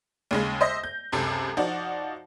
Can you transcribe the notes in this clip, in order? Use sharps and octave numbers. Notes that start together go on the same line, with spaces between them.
D#2 C#3 G#3
C5 D#5 E5 A#6
G6
C#2 F#2 C3 A4
F3 D#4 F#4 D5